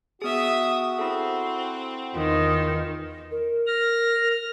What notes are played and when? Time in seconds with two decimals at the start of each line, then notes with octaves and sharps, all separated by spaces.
0.22 B3 F#4 G#4 E5 D#6
0.99 C4 E4 A4
2.14 E2 D#3 F4
3.31 A#4
3.67 F6 A#6